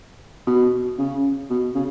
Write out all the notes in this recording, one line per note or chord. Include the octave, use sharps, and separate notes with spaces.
B2
C#3
B2
C#3